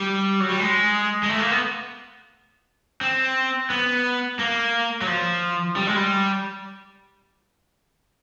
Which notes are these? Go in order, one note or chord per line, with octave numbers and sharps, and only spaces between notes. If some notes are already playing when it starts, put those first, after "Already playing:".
Already playing: G3
F#3
G3
G#3
G#3
A3
A#3
B3
C4
B3
A#3
F#3
F3
G3
G#3
G3